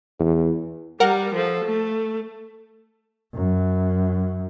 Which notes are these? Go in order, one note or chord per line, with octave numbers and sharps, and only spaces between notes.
E2
G3 A#4 F#5
F3 A4
A3
F#2